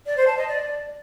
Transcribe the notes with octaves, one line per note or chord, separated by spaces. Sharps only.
D5
C5
A5
D#5
D5